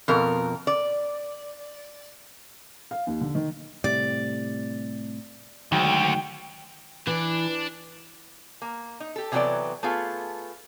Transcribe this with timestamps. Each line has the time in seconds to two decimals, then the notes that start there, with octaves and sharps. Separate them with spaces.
0.08 F2 B2 A#4
0.67 D5
2.91 F5
3.07 D#2
3.21 D3
3.35 D#3
3.84 A2 C3 G3 D5
5.72 D2 D#3 F#3 G#3 G5
7.07 E3 D4 D5
8.62 A#3
9.00 D#4
9.16 G4 A4
9.32 C3 E3 F#3 B3 A4 D5
9.83 A3 B3 F4 G#4